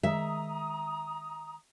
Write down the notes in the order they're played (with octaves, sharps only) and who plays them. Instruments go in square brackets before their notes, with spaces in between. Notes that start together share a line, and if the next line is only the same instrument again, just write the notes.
[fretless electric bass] D#3 G#3 [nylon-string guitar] E5 [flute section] A#5 D#6